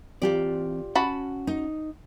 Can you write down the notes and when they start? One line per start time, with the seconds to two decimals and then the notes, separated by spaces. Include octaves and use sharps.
0.22 E3 C4 F4 G4 D5 A#5
0.95 C#4 F#4 A5 B5
1.47 D#4